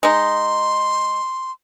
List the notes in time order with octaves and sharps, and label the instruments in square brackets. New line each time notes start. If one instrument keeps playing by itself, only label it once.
[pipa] G#3 D#4 [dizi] C6